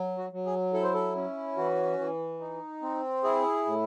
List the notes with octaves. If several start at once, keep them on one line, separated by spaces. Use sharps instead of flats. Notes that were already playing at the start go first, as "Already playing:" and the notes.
Already playing: F#3
F#4
F#3
G#4
E4 A4
C5
A4
C#4
E3 F#4
E3
D#4
C4
E4 G#4
A2